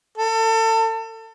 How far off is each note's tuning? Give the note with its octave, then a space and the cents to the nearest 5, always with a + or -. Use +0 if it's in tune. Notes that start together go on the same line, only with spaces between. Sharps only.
A4 +30